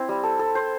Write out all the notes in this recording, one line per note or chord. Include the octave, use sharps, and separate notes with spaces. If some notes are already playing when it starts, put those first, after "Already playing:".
Already playing: C4 E4
G3
A4
A4
C5